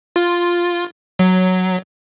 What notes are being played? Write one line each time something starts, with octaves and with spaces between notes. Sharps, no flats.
F4
F#3